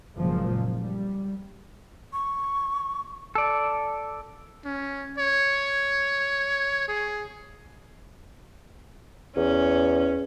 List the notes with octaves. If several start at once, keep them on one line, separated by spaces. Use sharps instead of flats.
F#1 A#2 F3 G#3
G3
C#6
A4 D5
C#4
C#5
G#4
E2 C#4